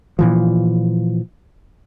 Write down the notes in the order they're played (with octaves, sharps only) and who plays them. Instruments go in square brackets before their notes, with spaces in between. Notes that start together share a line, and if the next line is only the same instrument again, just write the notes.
[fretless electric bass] A#2 E3 F3